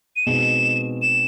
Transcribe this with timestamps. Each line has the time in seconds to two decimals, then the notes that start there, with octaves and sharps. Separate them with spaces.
0.16 D#7
0.26 B2 G#3 C4 D#4 G#4 E7
1.02 E7